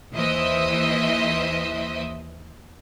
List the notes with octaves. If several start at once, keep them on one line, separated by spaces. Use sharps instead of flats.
D#2 E3 C5 D#5 E5